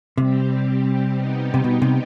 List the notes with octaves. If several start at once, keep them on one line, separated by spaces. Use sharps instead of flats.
C3 G3 C4 G4
G3 B3 D#4 G4
C3
B2
C3